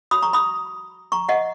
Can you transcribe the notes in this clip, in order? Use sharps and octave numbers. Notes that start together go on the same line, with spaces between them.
F#4 C#5 B5 D#6
A#5 C#6
B5 D#6
A#5 C#6
D#5 F#5